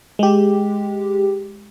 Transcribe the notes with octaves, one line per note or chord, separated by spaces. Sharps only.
G#3 G4